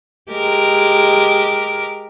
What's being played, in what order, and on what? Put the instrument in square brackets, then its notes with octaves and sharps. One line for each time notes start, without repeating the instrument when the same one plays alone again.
[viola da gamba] G#3 G4 A#4